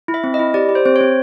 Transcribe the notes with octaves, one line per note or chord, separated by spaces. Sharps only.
E4
E5
C4
D#5
E4
G4 D5
G4
C5
C4 C5
C4 C#5